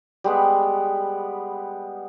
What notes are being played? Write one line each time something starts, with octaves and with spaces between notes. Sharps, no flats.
G3 G#3 B3